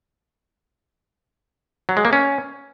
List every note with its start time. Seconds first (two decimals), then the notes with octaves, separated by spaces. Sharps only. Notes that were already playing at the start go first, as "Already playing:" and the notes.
1.89 F#3
1.97 G#3
2.05 A#3
2.13 C#4